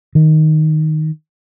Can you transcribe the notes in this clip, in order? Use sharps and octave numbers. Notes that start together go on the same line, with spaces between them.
D#3